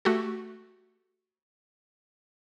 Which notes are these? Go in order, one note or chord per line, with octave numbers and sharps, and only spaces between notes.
A3 F#4 G4 A4